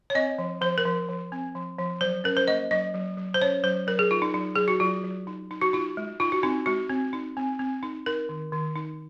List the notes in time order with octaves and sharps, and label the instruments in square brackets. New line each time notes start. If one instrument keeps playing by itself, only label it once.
[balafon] C#5
C4 D#5
F3
F3 C5
A#4
F3
F3
C4
F3
F3
F#3 C5
C#4 A#4
C5
A#3 D#5
F#3 D#5
F#3
F#3
C5
C#4 C#5
F#3 C5
F#3 A#4
G#4
D#4 F4
D#4
F#3 D#4
F#3 G#4
F#4
F#3 F4
F#3
D#4
D#4
F#4
D#4 F4
G#3
D#4 F4
F#4
C4 D#4
G#3 F#4
C4
D#4
C4
C4
D#4
D#4 A#4
D#3
D#3
D#4